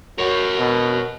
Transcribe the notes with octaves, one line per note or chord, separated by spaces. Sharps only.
F#4 A#4 C#5
B2